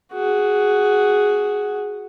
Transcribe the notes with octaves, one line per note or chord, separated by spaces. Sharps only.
F#4 G#4